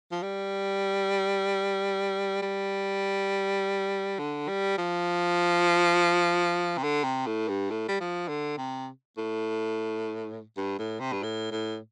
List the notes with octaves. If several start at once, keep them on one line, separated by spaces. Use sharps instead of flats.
F3
G3
G3
D3
G3
F3
C3
D3
C3
A2
G2
A2
G3
F3
D3
C3
A2
G2
A2
C3
G2
A2
A2